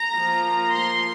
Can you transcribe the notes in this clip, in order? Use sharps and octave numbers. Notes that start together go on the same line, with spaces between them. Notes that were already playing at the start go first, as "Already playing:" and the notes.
Already playing: A#5
F3 A#3 F4
C6